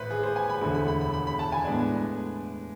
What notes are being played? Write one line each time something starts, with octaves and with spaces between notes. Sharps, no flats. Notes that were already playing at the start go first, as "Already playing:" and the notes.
Already playing: A1 A2 B4 C5
G#4
C5
G#5
B5
E1 D2 D3
B5
B5
B5
B5
B5
A5
G#5
A2 G#3 B3 D4